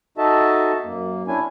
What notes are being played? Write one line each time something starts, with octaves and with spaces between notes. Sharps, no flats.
D#4 F#4 A4 D#5 E5 A5
F#2 A#3
C#4 D4 E4 G#5